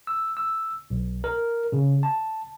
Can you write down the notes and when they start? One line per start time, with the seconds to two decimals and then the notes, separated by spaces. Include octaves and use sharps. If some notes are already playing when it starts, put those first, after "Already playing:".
0.07 E6
0.37 E6
0.90 B1
1.24 A#4
1.72 C#3
2.03 A5